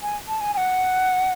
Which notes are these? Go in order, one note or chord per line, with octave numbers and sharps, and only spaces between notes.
G#5
A5
G#5
G#5
F#5